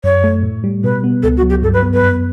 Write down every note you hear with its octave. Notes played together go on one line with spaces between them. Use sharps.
F#2 C#5
A3
A2
G3
B2 B4
B3
C#2 A4
F#4
F#3
G4
G2 A4
B4
B3
B4
F#2